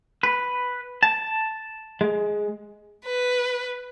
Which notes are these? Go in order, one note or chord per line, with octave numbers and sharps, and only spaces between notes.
B4
A5
G#3
B4